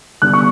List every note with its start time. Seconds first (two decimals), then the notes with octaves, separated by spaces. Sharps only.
0.22 D3 G3 B3 F#6
0.33 C#6